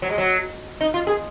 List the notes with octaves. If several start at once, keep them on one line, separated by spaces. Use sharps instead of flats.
F#3
G#3
F#3
D#4
F4
G#4